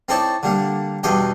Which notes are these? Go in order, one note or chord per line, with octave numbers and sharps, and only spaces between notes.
C4 D#4 E4 A4 C#5 D5
D3 G3 A#3
E2 G2 B2 G4 D#5 G5